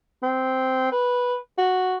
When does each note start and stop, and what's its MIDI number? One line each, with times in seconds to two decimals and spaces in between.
0.23 0.88 60
0.92 1.37 71
1.58 1.97 66